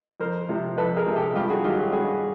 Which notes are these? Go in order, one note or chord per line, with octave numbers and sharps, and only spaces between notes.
F2 A#4 C5
C3 F3
F2 A4 B4
G#4 A#4
C3 F3
G4 A4
G2 F4 G4
F#4 G#4
D#3 F#3 F4 G4
F4 G4
G2 F#4 G#4